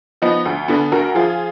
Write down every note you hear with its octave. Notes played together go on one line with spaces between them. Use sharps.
F3 B3 D#4
D2
D3 B3
D2 F#4 A#4
F3 F4 G#4